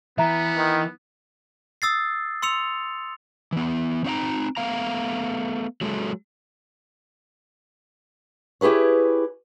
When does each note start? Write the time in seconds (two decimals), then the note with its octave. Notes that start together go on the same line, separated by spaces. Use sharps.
0.18 E3 B3 E5 A#5
0.57 D#3
1.82 D#6 E6 A6 C7
2.42 C6 E6 C#7 F7
3.52 E3 B3
4.04 C4 D#4 C#5 F5 G5 A#5
4.57 A3 B3 F5 A#5
5.81 F#3 G#3 A4
8.61 E4 G4 G#4 B4 C#5